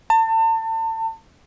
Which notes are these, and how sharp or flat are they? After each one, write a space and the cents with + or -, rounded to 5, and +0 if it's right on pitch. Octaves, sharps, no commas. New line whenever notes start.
A5 +35